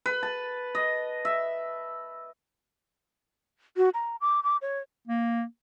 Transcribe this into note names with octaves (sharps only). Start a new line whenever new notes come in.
B4
A5
D#5
E5
F#4
A#5
D6
D6
C#5
A#3